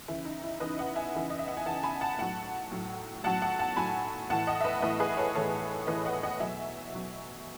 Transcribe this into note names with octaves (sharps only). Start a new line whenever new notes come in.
C#3 E3 E4
D#4
E4
C#3 E3 B4 D#5
D#5 F#5
E5 G#5
C#3 E3
D#5
E5
F#5
G#5
C#3 E3 F#5 A5
G#5 B5
F#5 A5
A2 F#3 F#5 A5
A2 F#3
A2 F#3 F#5 A5
F#5 A5
F#5 A5
A2 F#3 G#5 B5
A2 E3 F#5 A5
D#5 F#5
E5
B4 D#5
A2 E3 B4 D#5
G#4 B4
A4 C#5
A2 E3 A4 C#5
A2 E3 B4 D#5
D#5 F#5
D#5 F#5
B2 F#3 E5 G#5
B2 F#3